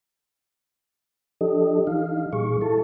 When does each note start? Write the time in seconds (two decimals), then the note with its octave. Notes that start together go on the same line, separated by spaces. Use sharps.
1.41 F3 D4 G4 A4 D#5
1.87 E3 D#4 F5
2.33 A#2 G3 G#4 C#6
2.62 E4 A4 A5